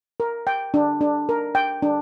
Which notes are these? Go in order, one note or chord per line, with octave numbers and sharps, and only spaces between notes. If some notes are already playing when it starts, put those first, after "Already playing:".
A#4
G5
D4
D4
A#4
G5
D4